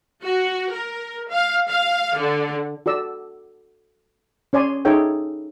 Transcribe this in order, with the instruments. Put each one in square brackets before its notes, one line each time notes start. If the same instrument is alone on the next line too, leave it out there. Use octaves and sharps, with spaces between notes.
[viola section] F#4
A#4
F5
F5
D3
[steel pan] F#4 A4 D5 E6
C#4 C#5 D5 G#5 C6
D#4 G#4 A4 C#5 E5 G5